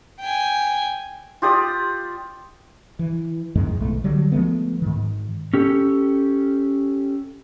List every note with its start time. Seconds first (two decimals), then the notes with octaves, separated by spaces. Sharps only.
0.20 G5 G#5
1.42 F4 G4 D5 D#6
2.99 E3
3.55 F#2 A2 D#3 G#3
3.80 B1 A3
4.04 D3 F#3 G3
4.32 F3 G#3 A3 B3
4.82 G#2 D#3
5.54 C#4 G4 A4